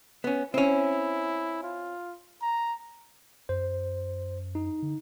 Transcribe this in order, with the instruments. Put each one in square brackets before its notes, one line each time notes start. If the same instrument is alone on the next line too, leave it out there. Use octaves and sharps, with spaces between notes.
[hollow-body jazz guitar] B3 C#4
[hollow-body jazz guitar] C4 C#4 [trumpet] E4
[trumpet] F4
A#5
[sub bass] F#2 [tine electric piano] C5
[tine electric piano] D#4
[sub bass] D3